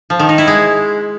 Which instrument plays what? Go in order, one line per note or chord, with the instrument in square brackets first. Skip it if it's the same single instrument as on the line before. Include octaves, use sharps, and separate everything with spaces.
[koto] F3
D#3
D#4
E4
G#3